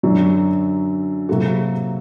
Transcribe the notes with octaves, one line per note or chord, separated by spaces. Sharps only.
F#2 D3 F#3
C3 F#3 A#3 F#4 A4